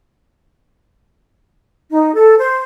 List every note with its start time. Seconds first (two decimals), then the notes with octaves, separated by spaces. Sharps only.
1.91 D#4
2.14 A4
2.39 C5